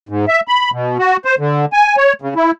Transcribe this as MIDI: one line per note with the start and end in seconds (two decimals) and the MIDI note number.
0.09 0.25 44
0.28 0.40 76
0.48 0.71 83
0.72 0.98 47
0.99 1.17 66
1.25 1.35 72
1.39 1.65 50
1.73 1.95 80
1.97 2.13 73
2.22 2.34 49
2.36 2.51 64